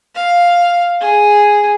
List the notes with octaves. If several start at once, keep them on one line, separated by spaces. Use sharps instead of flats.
F5
G#4